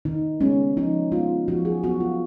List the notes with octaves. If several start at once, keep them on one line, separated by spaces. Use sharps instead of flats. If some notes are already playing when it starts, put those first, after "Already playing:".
D#3 D#4
G#3 B3 C#4
F3 D#4
G#3 B3 F4
F3 F#4
G#4
B3 F#4
F4